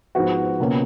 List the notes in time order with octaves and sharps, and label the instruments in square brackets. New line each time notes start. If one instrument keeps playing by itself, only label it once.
[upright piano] G#2 F3 B3 F#4
C#2 B2 A#3 C#4